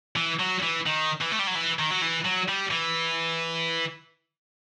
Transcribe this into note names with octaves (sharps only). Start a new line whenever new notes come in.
E3
F#3
E3
D#3
E3
A3
G3
F#3
E3
D#3
F#3
E3
F#3
G3
E3